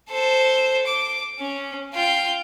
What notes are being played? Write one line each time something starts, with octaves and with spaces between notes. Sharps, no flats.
A4 C5
D6
C#4
F4 G5